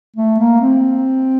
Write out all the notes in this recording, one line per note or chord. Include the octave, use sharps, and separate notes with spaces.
A3
A#3
C4